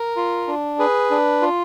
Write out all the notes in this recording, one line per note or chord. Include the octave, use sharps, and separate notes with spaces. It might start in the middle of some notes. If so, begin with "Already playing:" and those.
Already playing: A#4
F4
D4
G#4 B4
D4
F4